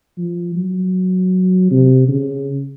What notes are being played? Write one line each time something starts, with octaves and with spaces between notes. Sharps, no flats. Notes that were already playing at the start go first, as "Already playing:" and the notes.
F3
F#3
C3
C#3